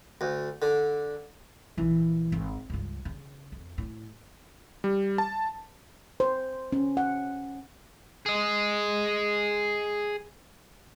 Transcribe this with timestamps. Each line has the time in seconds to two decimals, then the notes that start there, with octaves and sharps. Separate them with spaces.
0.21 D2
0.62 D3
1.78 A#1 E3
2.32 G#1
2.70 C#2 G2
3.05 C#3
3.52 F2
3.78 A2
4.84 G3
5.18 A5
6.20 C5
6.72 C#4
6.97 F#5
8.26 G#4 D#5